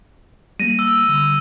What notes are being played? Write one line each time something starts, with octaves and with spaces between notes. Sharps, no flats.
G3 A#3 A#6 D#7
E6
D3 G3